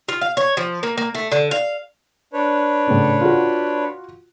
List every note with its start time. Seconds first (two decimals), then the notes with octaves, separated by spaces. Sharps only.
0.08 F4
0.21 F5
0.37 C#5
0.57 F3
0.83 A#3
0.98 A#3
1.15 A3
1.32 D3
1.51 F5
2.33 D4 B4 C#5
2.87 A2 C#3
3.21 F4 F#4